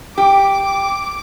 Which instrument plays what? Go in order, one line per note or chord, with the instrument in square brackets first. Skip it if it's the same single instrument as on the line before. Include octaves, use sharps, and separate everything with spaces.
[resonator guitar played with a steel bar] G4 [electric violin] D6